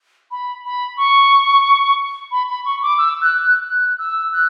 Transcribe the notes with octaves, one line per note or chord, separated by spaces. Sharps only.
B5
B5
C#6
B5
B5
C#6
D6
E6
F#6
F#6
F#6
E6
F#6